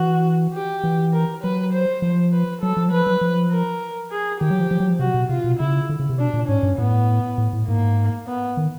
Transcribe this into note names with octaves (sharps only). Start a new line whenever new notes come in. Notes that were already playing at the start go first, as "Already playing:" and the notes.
Already playing: E3 F#4
G4
E3
A#4
F#3 B4
C5
F3
B4
F#3 A4
F3
F#3
F3 B4
F#3
F3
A#4
G#4
D#3 G4
F#3
F3
F3
F#3
F3
C3 F#4
B2
C3 F4
B2
C#3 E4
D3
C#3
C3
B2 D4
A#2
G#2 C#4
G2
A2 B3
A2
A2
G#2 A#3
B3
D#3